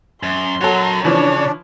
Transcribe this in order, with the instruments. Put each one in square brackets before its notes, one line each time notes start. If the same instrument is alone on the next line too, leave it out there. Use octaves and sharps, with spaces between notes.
[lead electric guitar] F#2 [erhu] C6
[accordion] F#3 [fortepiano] F#4 A4 [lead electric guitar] A#4 C#5
[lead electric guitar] C#3 [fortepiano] E3 F3 [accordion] D4 [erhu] C#5